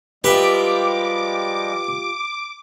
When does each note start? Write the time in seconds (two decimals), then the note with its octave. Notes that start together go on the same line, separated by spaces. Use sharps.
0.24 F3 G3 G#3 F4 G4 B4 E5 D6